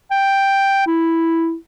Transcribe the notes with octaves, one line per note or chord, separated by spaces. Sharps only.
G5
E4